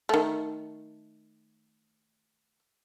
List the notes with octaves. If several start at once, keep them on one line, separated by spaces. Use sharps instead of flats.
D#3 A3